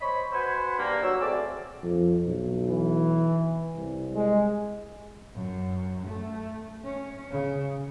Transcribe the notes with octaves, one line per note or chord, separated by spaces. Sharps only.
C5 C#5 D#5 B5
F#4 B4 C5 F#5 G#5 B5
G2 A#3
F#3 E6
A3 C4 G#4 D5
F2
B1
E3
C2
G#3
F#2
A3
C#4
C#3